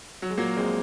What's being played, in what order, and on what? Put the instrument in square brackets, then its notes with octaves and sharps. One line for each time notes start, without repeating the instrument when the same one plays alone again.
[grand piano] F#3
G#3
A#2 F#3 A#3
A#1 G#3 C4